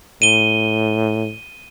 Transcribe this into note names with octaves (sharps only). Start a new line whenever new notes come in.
A2 D#7 G7